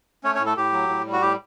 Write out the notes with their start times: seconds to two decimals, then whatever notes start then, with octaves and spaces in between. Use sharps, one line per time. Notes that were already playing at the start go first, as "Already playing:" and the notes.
0.24 A3 C#4 C#5
0.35 C#4 C#5
0.40 A2
0.46 A3 A4
0.57 A2 G4
0.73 F#3
0.89 A2
1.06 G3
1.12 F#4
1.21 A2 G4